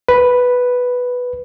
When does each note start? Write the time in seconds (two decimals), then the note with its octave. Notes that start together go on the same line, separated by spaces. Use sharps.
0.09 B4